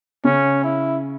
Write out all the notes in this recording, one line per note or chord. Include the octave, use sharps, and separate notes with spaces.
C#3 C#4
E4